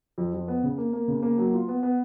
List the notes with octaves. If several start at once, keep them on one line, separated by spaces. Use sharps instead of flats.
F2
F2
B3
C#3
A#3
A#3
C#3
A#3
F#3
F4
B3
B3